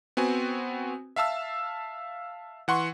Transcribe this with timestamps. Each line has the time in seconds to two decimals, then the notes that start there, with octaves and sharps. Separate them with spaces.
0.17 B3 C4 F#4 G#5
1.16 E5 F5 A5 E6
2.68 E3 F#5 C6 C#6